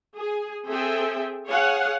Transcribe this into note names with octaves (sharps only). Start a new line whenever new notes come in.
G#4
C4 G#4 A4 E5 G5
G#4 C#5 F5 F#5